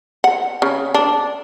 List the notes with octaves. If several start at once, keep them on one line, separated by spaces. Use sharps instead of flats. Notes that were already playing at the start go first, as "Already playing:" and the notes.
F#5
C#3
D4